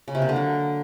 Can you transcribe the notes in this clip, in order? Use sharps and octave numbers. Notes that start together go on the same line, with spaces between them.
C#3
C3
A#3
D3
F#3